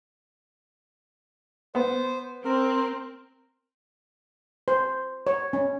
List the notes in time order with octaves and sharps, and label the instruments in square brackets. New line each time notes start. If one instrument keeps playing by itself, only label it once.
[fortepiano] B3 [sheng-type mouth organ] C5
[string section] C4 [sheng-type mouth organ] A#4
[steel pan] C5
C#5
C#4